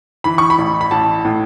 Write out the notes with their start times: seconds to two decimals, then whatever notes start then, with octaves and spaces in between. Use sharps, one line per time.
0.24 E3 B5
0.38 C#6
0.50 B5
0.58 A1
0.81 B5
0.91 A1 A5
1.25 A2